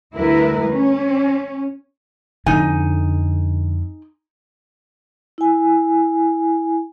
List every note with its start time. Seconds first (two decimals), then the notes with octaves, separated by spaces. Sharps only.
0.14 D2 G3 E4 A#4 B4
0.70 C#4
2.46 F2 D3 D#4 E4 G#5
5.38 E4 G#5